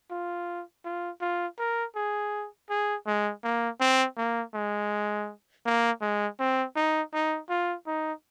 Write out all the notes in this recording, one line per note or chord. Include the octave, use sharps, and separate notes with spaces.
F4
F4
F4
A#4
G#4
G#4
G#3
A#3
C4
A#3
G#3
A#3
G#3
C4
D#4
D#4
F4
D#4